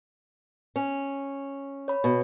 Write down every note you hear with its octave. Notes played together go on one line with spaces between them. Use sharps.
C#4
C#5 B5
B2